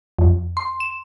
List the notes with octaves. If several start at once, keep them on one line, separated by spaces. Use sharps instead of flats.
F2
C6
E7